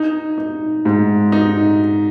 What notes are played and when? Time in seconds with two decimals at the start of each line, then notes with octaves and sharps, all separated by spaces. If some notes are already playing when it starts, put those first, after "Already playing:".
Already playing: D#4
0.38 D#4
0.85 G#2
1.32 D#4